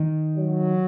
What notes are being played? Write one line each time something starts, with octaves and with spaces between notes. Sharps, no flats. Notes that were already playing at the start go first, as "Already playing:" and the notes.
Already playing: D#3
F#3